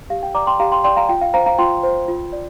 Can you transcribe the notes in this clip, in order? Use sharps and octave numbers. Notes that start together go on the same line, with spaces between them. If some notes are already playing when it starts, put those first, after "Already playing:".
G4 F5
G5
D5 A#5 D6
G5 C6
G4 F5 A#5
G5 C6
D5 G5 C6
F5 A#5
F4 G5
F5
C5 F5 A#5
F5 A#5
F4 G5 C6
C5
F4
D5